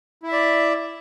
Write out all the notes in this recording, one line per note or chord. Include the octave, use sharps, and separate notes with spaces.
E4 D5 E5